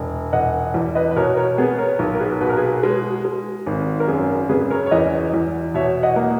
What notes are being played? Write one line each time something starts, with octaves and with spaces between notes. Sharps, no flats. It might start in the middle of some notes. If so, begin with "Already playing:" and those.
Already playing: E1
E1 D#5 F#5
E2
B4 D#5
B4
B2 A#4 C#5
A#4 C#5
B3 G#4 B4
A#4 C#5
B1
A#4
G#4 B4
B2 B4
A#4
G#4 B4
G#3
G#3
G#1
A#4
F#2 G#4
A#4
C#3 G#4 B4
A#4 C#5
C#5
E2 B4 D#5
E2
B2 C#5 E5
D#5 F#5
A#3